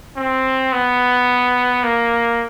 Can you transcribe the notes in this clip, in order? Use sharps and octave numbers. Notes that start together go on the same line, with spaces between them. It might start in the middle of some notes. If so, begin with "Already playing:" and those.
C4
B3
A#3